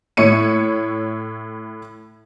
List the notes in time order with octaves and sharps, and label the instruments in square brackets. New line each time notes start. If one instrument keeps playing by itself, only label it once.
[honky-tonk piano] A2 E4 C#5 C#7 D#7